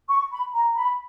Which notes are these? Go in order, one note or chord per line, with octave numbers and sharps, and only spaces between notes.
C#6
B5
A#5
B5